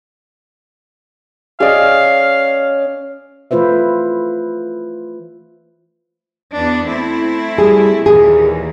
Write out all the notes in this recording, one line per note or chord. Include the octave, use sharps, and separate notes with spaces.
C#4 G#4 D5 D#5 F5
E3 A3 F4 B4 C5 E5
E2 B3 D4
A3 C4 E4
G3 G#4
D#2 A#2 E3 G#4